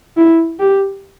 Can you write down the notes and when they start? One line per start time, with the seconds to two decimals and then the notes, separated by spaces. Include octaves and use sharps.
0.17 E4
0.60 G4